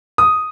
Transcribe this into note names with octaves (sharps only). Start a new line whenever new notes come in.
D#6